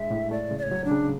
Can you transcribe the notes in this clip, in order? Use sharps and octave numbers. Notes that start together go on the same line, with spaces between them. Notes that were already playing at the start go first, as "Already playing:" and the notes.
Already playing: A2 G#3 D4 E5
A2
A3 D5
C#3
D5
C#5
F#3
D4
C#3